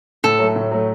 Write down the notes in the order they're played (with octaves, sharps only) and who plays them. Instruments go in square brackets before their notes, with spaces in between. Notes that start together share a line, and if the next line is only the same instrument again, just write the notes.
[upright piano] A2 [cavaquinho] A4
[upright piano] F#3 A3
A2
F#3 A3